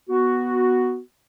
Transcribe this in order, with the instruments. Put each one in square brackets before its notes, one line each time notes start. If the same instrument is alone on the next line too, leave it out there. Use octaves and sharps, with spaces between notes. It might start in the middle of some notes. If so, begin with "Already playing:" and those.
[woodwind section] B3 F#4